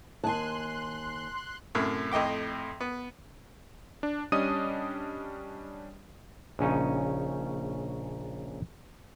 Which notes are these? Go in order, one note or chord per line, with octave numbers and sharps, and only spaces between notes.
D#2 G#5 A5 C6 F#6
F#2 A2 C3
F2 A2 D#5 G5 D6
B3
D4
G3 C#4 D4 D#5 D#6 D#7
A#1 C#3 C#4 D#4